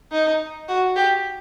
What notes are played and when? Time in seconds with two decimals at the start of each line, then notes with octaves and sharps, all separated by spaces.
0.12 D#4
0.68 F#4
0.96 G4